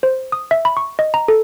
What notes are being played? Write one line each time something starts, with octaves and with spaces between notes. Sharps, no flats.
C5
D#6
E5
B5
C#6
D#5
A#5
A4